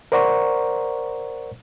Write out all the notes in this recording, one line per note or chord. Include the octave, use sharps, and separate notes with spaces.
A#4 C5 D5 F#5 A#5 C#6